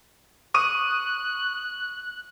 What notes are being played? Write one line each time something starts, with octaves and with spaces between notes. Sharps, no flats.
C#6 D#6 F#6 D#7